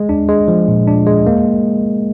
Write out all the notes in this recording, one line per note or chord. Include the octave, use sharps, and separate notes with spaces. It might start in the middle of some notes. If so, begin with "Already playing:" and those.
Already playing: G#3
D4
G#3
F3
A#2
D4
G#3
A#3